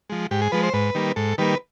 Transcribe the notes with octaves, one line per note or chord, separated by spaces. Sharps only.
F3 G#3
G#2 G4
G#4
F3 G#3 B4
C5
G#2 B4
D#3 G3 A#3
G#2 A4
D#3 G3 A#3 B4